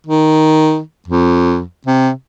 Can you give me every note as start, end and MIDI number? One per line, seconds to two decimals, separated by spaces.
0.07 0.79 51
1.08 1.62 41
1.87 2.11 48